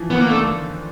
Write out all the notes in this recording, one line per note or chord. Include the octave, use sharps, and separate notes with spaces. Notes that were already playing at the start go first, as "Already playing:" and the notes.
Already playing: E3 F3
D#3 B3
A#3
D3 A3